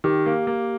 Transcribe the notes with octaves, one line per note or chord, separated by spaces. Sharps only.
D#3 G4
A#3
A#3